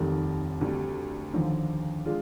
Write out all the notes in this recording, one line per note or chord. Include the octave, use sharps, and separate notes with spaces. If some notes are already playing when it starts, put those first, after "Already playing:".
Already playing: F1 D#2 D#3 G3
D2 C3 G3
D#2 D3 F3
G#3 D4 F4